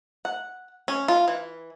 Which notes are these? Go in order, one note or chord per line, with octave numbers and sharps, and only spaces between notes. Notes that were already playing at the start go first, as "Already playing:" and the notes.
F#5
C#4
F4
E3